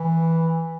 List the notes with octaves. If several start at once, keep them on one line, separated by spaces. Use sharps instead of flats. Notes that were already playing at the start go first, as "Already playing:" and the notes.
Already playing: E3